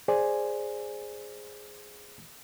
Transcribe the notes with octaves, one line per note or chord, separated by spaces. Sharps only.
G#4 C5 D5 G#5